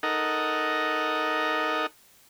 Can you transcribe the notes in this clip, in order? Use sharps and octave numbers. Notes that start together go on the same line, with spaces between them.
D#4 A4 A#4 D#5 F#5